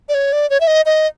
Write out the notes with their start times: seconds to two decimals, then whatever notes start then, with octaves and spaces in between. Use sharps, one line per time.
0.09 D5
0.14 C#5
0.33 D5
0.50 C#5
0.61 E5
0.67 D#5
0.86 D#5